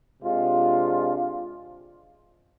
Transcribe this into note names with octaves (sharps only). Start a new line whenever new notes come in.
C3 G#3 D4 F4